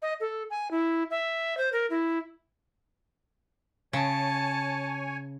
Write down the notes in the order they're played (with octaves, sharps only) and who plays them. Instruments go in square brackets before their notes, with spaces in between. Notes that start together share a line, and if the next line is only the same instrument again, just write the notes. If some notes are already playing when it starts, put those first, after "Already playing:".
[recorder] D#5
A4
G#5
E4
E5
C5
A#4
E4
[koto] C#3 [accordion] C#5 G#5 [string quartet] A5